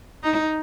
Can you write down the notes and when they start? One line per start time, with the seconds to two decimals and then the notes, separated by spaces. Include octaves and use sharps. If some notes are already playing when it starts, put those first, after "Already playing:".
0.23 D#4